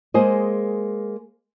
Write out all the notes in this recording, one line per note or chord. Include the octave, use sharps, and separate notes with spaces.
G#3 A#3 G#4 C5 D#5